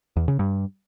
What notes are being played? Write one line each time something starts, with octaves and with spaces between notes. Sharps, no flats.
E2
C#3
G2